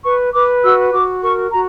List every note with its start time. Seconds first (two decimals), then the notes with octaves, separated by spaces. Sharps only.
0.04 B4 C#6
0.34 B4 D6
0.63 F#4 E6
0.94 F#4 D6
1.23 A#4 C#6
1.52 F#4 A#5